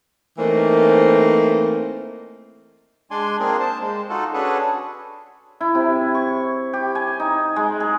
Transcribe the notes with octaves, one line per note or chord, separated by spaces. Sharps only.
E3 A3 A#3 C4 D#4 C5
G#3 D4 D5 G#5 C6
A#3 C4 D4 F4 G#4
C5 A5
G#3
D#4 F4 F#4 A4
C#4 D4 F#4 G#4 A4 B4
E4
C3
C#6
G4
G#5
D#4
G#3
G#4